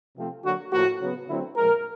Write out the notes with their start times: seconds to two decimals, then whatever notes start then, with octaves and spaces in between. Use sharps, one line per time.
0.16 C3 F3 A3 C4
0.44 D3 F#3 A#3 F#4
0.72 A2 F3 A#3 F#4
1.00 C#3 F#3 B3
1.29 D3 F#3 A3 C4 E4
1.56 A#2 F3 G#3 A#4